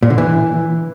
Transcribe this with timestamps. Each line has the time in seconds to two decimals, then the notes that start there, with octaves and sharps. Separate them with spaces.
0.03 A#2
0.10 D3
0.18 E3